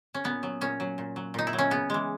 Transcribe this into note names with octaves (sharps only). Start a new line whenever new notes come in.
C#4
A#2 B3
F#3
A#2 C#4
F#3
A#2
F#3
A#2 D#4
E4
F#3
C#4
C#3 B3
E3 G#3